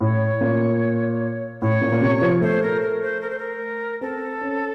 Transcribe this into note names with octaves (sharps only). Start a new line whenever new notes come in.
A2 C#5
A#2
A2 C#5
A#2
A#2
C3
F3
A3 C5
A#4
A#4
C5
A#4
C5
A#4
C4 A4
C#4